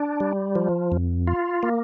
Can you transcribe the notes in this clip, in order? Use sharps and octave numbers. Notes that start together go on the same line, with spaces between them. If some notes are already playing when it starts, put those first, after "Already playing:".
Already playing: D4
G3
F3
F2
F4
A#3